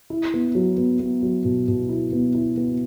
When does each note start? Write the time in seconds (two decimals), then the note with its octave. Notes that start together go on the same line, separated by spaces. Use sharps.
0.10 E4
0.34 B3
0.55 F#3
0.78 B3
1.00 B3
1.22 F#3
1.45 B2
1.68 B2
1.89 E4
2.13 B3
2.35 E4
2.57 B3